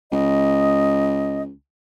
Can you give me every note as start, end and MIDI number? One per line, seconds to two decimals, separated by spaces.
0.12 1.50 37
0.12 1.42 75